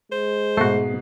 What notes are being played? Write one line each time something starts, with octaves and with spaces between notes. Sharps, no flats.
G#3 C5
G#2 B2 A3 F#4 C7